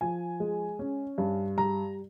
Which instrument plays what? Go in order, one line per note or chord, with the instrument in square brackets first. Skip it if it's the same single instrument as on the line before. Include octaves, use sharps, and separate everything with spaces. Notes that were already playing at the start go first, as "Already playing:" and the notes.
[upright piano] F3 G#5
G#3
C#4
G2
G3 A#5